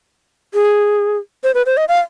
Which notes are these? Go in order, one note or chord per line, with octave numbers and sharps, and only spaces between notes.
G#4
C5
B4
C5
D#5
F5